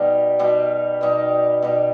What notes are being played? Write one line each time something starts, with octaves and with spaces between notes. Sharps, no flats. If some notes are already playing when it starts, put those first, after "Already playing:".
Already playing: B2 G3 D#4
B2 G3 D#4
B2 G3 D#4
B2 G3 D#4